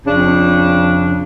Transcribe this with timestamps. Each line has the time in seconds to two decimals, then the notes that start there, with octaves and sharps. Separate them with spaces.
0.06 F2 C#3 D4